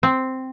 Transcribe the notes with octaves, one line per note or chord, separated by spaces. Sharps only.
C4